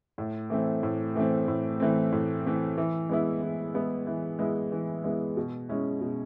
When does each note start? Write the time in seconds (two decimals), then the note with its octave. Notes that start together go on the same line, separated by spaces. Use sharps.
0.18 A2
0.50 E3 A3 C4
0.83 A2
1.15 E3 A3 C4
1.48 A2
1.80 E3 A3 C4
2.12 A2
2.45 E3 A3 C4
2.77 E3
3.09 G#3 B3 E4
3.42 E3
3.74 G#3 B3 E4
4.07 E3
4.39 G#3 B3 E4
4.72 E3
5.04 G#3 B3 E4
5.37 B2
5.69 G#3 C#4 E4
6.01 B2